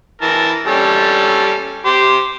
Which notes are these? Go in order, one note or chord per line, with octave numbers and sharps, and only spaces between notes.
E3 A#4 A5
G3 C#4 A4
G4 C5